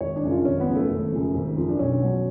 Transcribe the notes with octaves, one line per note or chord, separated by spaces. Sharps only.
G#1 C#5
D4
F#2 C#3 F3
F4
G#1 C#4
B3
F#2 C#3 F3
A3
G#1
F#2 C#3 F3
G#1
F#2 C#3 F3
D4
B1 C#4
B2 F#3